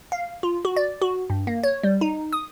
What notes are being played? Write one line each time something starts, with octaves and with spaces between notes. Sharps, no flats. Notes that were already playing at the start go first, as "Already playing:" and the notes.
F5
F4
F#4
D5
F#4
G2
A#3
C#5
G3
D#4
D#6